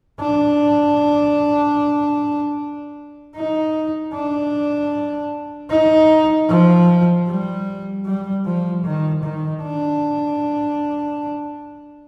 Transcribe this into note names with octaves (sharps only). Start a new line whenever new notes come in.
D4
D#4
D4
D#4
F3
G3
G3
F3
D#3
D#3
D4